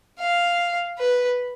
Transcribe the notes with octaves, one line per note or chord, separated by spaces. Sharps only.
F5
B4